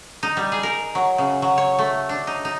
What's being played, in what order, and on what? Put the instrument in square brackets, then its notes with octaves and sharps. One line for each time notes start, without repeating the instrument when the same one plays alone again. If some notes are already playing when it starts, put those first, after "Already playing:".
[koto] D#4
G3
G#4
A#4
F#3
C#3
F#3
C#5
A3
D4
D#4
D#4